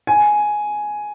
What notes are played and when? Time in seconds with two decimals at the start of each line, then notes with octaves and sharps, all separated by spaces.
0.07 G#5